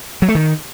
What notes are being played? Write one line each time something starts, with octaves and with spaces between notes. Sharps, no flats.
F#3
A3
D#3